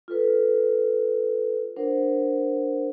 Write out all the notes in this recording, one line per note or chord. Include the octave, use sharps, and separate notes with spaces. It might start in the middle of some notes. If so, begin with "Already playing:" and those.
F4 A4 B4
D4 A#4 C5 F#5